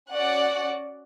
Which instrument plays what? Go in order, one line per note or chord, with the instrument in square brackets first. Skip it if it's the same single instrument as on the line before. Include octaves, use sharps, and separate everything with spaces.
[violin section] C#4 F#4 D5 F#5